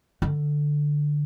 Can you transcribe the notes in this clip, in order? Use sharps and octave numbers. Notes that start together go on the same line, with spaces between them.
D3